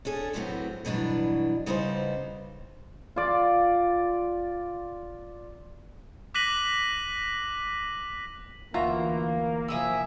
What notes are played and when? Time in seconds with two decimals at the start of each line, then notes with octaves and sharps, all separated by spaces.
0.05 C#4 D4 G#4 A4
0.33 F2 A2 C3 F#3 B3 C4
0.85 G2 B2 E3 F#3 D4
1.66 C#3 G3 B3 D#4 B4 C5
3.16 F4 D5
6.34 D6 F#6 A#6 B6 D#7 F#7
8.74 D2 E3 A#3 F4 F#4 E5 A#5
9.68 C3 F3 E4 G#4 E5